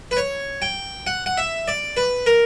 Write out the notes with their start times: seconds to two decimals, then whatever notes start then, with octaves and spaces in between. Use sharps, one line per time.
0.11 B4
0.17 C#5
0.62 G5
1.07 F#5
1.26 F#5
1.38 E5
1.68 D5
1.97 B4
2.26 A#4